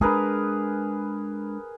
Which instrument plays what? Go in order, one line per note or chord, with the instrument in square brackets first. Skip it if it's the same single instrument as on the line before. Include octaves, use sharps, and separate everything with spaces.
[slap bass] G#3 D4 [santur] G#4 A#4 B4